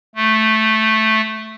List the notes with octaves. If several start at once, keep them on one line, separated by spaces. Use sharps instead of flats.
A3